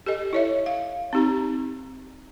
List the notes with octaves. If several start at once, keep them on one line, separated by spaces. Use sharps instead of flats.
G4 A4 D#5
E4 C#5 E5
F5
C4 D#4 G4 A#5